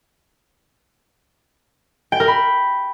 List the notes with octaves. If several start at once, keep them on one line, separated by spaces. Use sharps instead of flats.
G5
A#4
B5